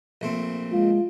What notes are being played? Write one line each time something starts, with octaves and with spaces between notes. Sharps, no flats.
A#1 A3 C4
G#3 F4